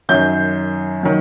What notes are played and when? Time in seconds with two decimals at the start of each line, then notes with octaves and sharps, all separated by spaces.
0.09 F#2 D#3 F#3 G6
1.03 D#3 F#3